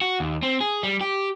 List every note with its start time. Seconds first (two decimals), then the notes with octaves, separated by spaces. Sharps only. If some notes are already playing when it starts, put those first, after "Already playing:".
0.02 F#4
0.20 D#2
0.43 C4
0.61 G#4
0.83 G3
1.01 G4